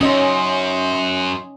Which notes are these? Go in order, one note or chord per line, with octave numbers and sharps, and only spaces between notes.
F#2 C#4 D#5 C6 D#6